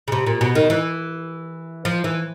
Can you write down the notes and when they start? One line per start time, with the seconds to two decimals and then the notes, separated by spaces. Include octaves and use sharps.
0.08 C#3
0.12 C3
0.26 A#2
0.41 B2
0.55 D#3
0.70 E3
1.85 F3
2.04 E3